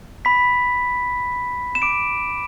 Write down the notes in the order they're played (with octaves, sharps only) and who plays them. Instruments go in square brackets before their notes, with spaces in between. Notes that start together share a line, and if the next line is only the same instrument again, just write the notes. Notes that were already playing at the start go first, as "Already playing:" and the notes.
[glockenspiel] B5 B6
E7
D6 D7